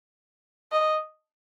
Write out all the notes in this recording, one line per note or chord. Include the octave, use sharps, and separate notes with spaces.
D#5